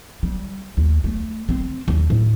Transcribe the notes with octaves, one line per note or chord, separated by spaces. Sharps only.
G3
D#2
A3
C4
D#2
A2